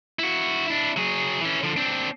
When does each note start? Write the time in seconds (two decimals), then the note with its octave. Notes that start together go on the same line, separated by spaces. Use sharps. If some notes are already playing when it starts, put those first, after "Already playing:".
0.19 E4 F#4
0.68 D4 E4
0.97 F#3 G#4
1.41 E3 C#4
1.63 D3 F3
1.77 C4 D4